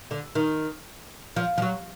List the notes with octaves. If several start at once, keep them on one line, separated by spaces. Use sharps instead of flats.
D3
D#3
F3
F3
F#3